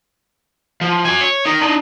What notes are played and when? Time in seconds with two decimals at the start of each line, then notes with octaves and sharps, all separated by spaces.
0.81 F3
1.05 F#4 G#5
1.21 C#5
1.45 D#4 A#4
1.61 D4 D#4